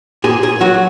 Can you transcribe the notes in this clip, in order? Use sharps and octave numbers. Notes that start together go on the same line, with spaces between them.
A#2 G#4
G#4
F#3 F#4